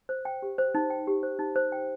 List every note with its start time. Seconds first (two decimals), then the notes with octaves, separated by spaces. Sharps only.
0.09 C5
0.25 G5
0.42 G4
0.58 C5
0.75 D#4
0.90 G5
1.07 G4
1.23 C5
1.39 D#4
1.56 C5
1.72 G5